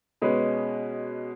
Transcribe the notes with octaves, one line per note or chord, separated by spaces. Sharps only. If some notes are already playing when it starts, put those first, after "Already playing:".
B2 G#3 C#4 B4